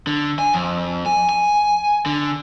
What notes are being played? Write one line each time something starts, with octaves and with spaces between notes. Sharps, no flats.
D3
G#5
F2
G#5
G#5
D3